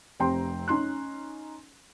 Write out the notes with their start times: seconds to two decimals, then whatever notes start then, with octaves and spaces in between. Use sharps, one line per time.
0.20 F1 C4 G4 G5 A#5 C6
0.68 C#4 D#4 C6 F#6